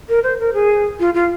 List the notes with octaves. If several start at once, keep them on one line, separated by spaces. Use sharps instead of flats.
A#4
C5
A#4
G#4
F4
F4